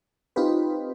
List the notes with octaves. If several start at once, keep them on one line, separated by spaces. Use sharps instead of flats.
C4 D#4 F4 G4 B4